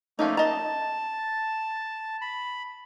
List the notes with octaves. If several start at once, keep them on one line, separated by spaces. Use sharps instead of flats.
F3 A3 A#3 C#4 D#4
D#5 A5 A#5
B5